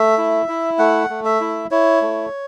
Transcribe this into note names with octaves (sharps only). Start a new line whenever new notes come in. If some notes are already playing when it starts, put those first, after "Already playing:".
Already playing: A3 E5
E4
E4
A3 F#5
A3
E5
E4
E4 C#5
A3